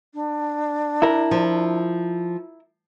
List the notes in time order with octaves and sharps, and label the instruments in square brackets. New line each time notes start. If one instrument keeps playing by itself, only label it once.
[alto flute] D4
[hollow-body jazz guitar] E4 A#4
[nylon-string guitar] F3